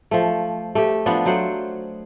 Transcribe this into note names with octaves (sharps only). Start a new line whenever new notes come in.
F3 A3
A3 G4
F3 B3 D4
F#3 A3 C5 F#5